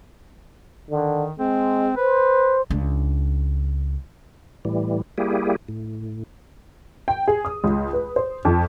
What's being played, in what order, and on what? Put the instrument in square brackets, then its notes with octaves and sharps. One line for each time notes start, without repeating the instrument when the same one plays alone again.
[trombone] D3 [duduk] D#3
[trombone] G#3 [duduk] C4
[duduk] B4 [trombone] C5
[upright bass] C#2 D4
[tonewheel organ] A2 E3 G3
G3 A#3 E4 G4 G#4
A2
[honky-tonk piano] G5
G#4
D#6
C#2
B4
C5
F2